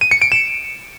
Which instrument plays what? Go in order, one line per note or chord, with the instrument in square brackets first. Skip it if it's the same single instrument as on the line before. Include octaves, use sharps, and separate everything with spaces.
[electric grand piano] D#7
C#7
D7
E7